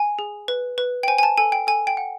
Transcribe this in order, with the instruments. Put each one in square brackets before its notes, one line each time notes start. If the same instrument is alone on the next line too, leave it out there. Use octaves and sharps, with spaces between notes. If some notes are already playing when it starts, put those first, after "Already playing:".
Already playing: [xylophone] G#5
G#4
B4
B4
G5
C5 G#5
G#5
A5
A4 G#5
G5
A4 G#5
G5
F#5